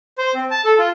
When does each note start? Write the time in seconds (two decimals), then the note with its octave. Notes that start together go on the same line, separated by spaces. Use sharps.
0.18 C5
0.34 C4
0.51 A5
0.65 A4
0.79 F4